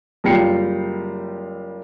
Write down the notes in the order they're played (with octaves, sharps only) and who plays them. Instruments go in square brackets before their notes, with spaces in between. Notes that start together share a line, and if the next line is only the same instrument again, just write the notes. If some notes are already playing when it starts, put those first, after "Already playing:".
[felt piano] F#1 G3 F4 G5 C7 C#7